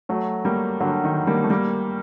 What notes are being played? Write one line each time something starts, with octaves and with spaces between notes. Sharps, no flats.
F#3 A3
G3 A#3
D3 F#3
D#3
G3 A#3
A3
G3 A#3